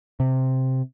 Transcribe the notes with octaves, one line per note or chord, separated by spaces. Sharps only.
C3